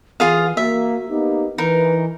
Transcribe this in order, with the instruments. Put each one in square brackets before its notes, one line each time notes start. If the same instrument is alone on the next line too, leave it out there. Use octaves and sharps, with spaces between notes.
[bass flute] E3 [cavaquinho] F4 G#4 F5
[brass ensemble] A#3 [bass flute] F#4 [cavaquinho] E5
[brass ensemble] A#3 B3 D#4 [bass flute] G4
[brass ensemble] E3 [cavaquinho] D#4 A#4 [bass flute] B4